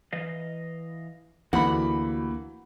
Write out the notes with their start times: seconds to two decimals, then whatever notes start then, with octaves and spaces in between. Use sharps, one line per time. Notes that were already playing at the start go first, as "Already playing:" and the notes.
0.13 E3 D#5 F5
1.53 D2 E3 A#3 F#4 G4 F#5 B5